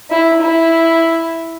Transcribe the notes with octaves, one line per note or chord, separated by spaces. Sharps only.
E4
E4